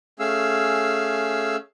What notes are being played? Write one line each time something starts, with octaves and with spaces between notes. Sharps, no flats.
A3 C#4 G#4 F5 E6